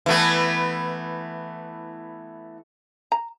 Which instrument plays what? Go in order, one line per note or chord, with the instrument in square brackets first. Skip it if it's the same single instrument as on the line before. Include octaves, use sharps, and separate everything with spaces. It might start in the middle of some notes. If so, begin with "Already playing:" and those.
[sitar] E3 A3 B3
[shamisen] A#5